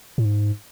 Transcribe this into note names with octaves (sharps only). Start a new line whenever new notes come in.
A2
G#2